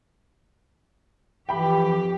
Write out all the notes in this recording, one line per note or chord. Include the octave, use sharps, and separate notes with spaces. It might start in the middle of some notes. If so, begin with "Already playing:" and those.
F2 E3 G4 G5 B5